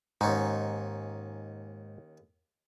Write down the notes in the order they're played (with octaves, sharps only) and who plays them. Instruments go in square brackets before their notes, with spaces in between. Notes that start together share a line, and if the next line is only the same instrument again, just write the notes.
[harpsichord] D#2 C#4 D#4 [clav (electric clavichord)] G#2